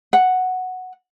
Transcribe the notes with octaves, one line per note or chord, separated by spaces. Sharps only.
F#5